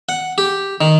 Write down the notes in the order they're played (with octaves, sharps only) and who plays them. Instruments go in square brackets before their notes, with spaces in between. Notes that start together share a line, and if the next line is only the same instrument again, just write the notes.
[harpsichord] F#5
G4
D#3